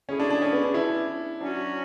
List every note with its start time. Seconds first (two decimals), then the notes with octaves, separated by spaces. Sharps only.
0.08 D3 A3 C#4 E4 G#4
0.20 D4
0.30 D4
0.42 C#4
0.53 B3
0.64 D4
0.74 E4
1.41 F#3 C#4 D4 F#4